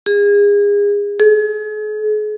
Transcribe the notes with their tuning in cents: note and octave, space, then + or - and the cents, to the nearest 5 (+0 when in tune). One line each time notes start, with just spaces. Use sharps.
G#4 -30
G#4 +40